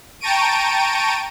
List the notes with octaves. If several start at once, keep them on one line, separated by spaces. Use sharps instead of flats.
G5 A5 A#5 C#6 D7 D#7